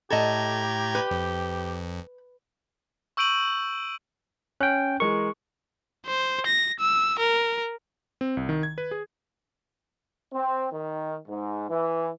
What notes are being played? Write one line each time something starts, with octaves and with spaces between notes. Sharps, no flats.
A2 G4 A4 D#5 A#5 G#6
B4
F2
C#6 E6 G6 D7 D#7 F#7
C#4 G5 F#6
E3 G#3 A#4 C#6
C5
A#6
E6
A#4
C4
C2
D#3
G#6
B4
G#4
C4
D#3
G#2
E3